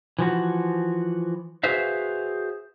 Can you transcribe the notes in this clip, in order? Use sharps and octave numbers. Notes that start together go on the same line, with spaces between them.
E3 F3 F#4
F#4 G#4 B4 C5 E5 F5